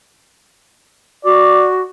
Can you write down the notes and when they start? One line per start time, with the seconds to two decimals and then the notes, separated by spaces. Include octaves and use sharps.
1.25 F#4 D5